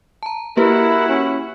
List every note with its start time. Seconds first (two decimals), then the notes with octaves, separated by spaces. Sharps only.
0.23 A5 A#5
0.57 A#3 E4 F#4 G4 A#4 B4 F#5
1.09 C#4